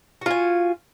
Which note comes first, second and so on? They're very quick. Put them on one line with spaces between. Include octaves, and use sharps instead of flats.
F#4 F4 G#5